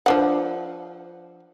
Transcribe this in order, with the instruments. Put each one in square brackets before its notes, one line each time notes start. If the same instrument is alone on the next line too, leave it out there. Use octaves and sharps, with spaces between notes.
[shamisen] F3 D4 F#5